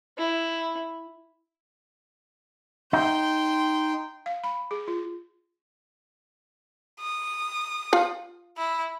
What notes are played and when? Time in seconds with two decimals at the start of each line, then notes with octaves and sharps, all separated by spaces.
0.18 E4
2.93 D#4 G5 C6
4.26 F5
4.44 B5
4.71 G#4
4.88 F4
7.01 D#6
7.93 F4 F5
8.58 E4